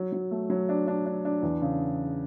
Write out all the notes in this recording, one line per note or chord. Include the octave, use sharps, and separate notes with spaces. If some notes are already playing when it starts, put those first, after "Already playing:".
Already playing: F#3
F#3
A3
F#3
D4
D4
D4
D4
E2
C#3